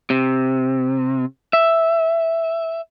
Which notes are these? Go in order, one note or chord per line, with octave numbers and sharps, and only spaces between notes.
C3
E5